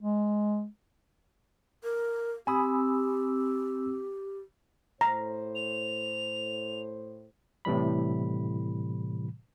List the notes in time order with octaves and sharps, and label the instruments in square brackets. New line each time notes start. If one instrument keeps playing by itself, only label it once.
[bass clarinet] G#3
[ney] A#4
[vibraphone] C4 E6 [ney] G4 [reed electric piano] G#5 B5 D#6
[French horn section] A2 C5 [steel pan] A#5
[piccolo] F7
[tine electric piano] A2 C3 E3 G3 B5